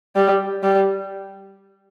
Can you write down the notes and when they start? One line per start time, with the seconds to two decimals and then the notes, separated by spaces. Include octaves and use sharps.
0.16 G3
0.63 G3